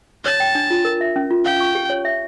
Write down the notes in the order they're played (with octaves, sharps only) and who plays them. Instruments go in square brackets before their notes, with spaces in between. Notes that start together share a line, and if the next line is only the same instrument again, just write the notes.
[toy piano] C#5 [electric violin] A5
[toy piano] G5
D4
F4
A#4
E5
C#4
F4
[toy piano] F5 [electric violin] G5
[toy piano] C#6
G4
C#5
E5